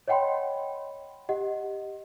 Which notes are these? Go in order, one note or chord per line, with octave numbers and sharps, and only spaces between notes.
C#5 D#5 F#5 G5 B5 C6
G4 D#5 F#5